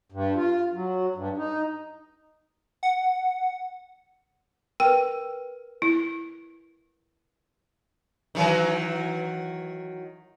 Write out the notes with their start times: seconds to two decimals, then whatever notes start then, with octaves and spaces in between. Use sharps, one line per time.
0.12 G2
0.36 F4
0.74 F#3
1.16 G2
1.37 D#4
2.83 F#5
4.80 A#4 B4 G5
5.82 E4
8.35 D#3 E3 F#3